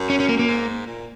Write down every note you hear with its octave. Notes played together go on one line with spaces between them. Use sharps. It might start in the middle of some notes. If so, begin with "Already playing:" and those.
Already playing: F#2
C#4
C#4
A#3
A#3
G#2
A#2